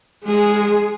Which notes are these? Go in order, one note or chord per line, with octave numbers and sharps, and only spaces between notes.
G#3 G#4